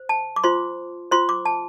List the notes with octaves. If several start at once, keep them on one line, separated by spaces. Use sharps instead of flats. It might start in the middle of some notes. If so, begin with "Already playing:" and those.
Already playing: C5
A5
D6
F4 C5 C6
F4 C5 C6
D6
A5